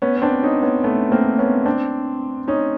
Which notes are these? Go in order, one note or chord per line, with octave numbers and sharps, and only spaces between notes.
B3 C#4
C#4
C4 D4
C#4 D#4
B3 C#4
A3 B3
A#3 C4
B3 C#4
C4 D4
C#4 D#4